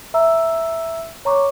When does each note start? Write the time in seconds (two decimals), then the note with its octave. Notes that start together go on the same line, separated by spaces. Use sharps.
0.14 E5 A#5 E6
1.25 C#5 A#5 C#6 D6